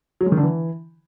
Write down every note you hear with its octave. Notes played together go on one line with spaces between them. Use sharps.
F#3
G#3
D#3
D3
E3